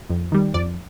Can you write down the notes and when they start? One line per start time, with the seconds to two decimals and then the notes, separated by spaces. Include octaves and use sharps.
0.09 F2
0.32 D#3 G3
0.54 F2 D5